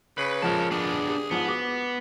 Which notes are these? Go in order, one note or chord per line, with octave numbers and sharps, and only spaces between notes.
C#3 B4
F2 F3 G#3 A#4 A5
B3 D4 G#4
G4
G#2 F3 B3
F#4 D6